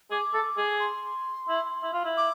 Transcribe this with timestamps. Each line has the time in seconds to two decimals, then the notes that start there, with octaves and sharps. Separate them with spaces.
0.11 G#4 D6
0.34 A4
0.57 G#4
0.80 C6
1.49 E4
1.83 E4
1.93 F4
2.04 E4
2.17 D6